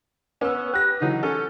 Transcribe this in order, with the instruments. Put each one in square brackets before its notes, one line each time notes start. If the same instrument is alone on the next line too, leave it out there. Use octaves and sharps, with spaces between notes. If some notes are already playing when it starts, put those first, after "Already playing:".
[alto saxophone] B3 [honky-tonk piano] C#4 E6
[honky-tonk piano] G4 A#6 [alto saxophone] B4
[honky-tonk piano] D3 E3 F#3 [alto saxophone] D#4
[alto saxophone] C#4 [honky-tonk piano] A4